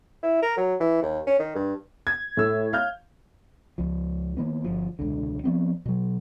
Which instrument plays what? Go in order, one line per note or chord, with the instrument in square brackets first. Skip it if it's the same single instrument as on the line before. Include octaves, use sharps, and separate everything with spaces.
[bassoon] E4
A#4
F#3
E3
D#2
C#4
D#3
G2
[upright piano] G#6
[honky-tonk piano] A2 [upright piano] A3 E6
[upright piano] F5 F6 G6
[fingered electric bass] C#2 F3
D#3 A#3 B3
G1 F3
E1 C#2 D3
F3 B3 C4
B2 F#3